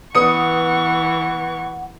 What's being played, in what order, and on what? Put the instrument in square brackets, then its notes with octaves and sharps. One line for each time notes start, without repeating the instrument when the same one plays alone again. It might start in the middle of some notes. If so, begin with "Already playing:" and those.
[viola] E3 C#6 [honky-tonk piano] B3 D#6 C#7 [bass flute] F#5